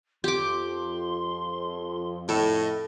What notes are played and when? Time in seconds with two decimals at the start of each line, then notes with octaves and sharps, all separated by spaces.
0.24 F2 G4 C6 D6
2.29 A2 A4 D#5